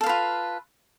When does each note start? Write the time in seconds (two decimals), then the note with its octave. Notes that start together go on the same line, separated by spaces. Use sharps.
0.01 A4
0.04 F5
0.06 B4
0.09 F4